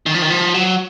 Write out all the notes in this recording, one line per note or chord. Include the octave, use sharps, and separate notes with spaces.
D#3
F3
D#3
F3
F#3